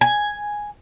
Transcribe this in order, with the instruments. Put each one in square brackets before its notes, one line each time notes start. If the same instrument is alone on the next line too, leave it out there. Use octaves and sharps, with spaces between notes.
[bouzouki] G#5